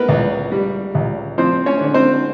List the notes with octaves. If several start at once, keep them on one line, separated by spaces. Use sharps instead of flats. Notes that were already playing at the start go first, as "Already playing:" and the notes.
Already playing: B3 A#4 B4
C#2
G3
C#2
F3 C4 C5
C#4 C#5
D3
C4 C5